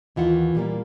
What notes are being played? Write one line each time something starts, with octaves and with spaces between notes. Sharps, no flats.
D#2 E3 F4 F#5
A#2 G3 A#3